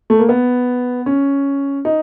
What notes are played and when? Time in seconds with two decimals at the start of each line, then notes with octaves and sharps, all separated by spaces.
0.10 A3
0.19 A#3
0.29 B3
1.06 C#4
1.85 D#4